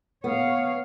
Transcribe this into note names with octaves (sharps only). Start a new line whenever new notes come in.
B3 C#5 F5